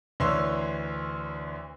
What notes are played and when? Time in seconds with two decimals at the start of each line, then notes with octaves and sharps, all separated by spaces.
0.20 D2 E3 D4 C#5 C6 E6